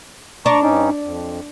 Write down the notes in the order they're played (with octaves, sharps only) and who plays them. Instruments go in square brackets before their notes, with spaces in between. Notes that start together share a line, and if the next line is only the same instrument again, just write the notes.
[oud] D4 [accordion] A#5 C#6
[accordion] G2 C#4 D#4
F2